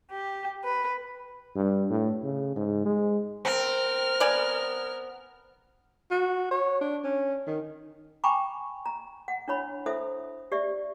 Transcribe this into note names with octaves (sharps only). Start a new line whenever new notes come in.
G4
B4
G2
A2
C#3
G#2
G#3
C4 A#4 F6
B3 D5 G#5
F#4
C#5
D4
C#4
D#3
G5 G#5 A#5 B5 C#6 D6
A#5
F#5
D4 E4 C#5 B5
E4 A4 C5 E5 D#6
G4 D5 E5